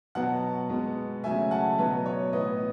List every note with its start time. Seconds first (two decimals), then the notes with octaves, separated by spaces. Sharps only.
0.15 B2 F#3 B3 F#5 A5
0.70 B2 G#3 B3
1.24 C#3 F#3 A3 E5 G#5
1.51 F#5 A5
1.78 B2 F#3 B3 B4
2.06 C#5
2.33 A2 E3 B3 B4 D#5